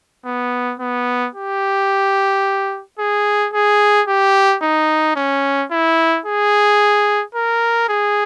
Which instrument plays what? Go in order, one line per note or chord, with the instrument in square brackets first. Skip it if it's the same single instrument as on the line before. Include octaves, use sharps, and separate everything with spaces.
[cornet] B3
B3
G4
G#4
G#4
G4
D#4
C#4
E4
G#4
A#4
G#4